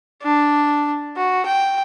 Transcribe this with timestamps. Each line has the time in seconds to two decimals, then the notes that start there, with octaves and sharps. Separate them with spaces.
0.22 D4
1.17 F#4
1.46 G5